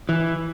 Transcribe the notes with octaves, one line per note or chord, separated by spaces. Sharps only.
E3